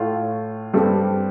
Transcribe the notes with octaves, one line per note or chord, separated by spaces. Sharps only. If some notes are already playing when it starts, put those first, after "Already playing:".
Already playing: A2 A3 F4
G2 G3 C4 A4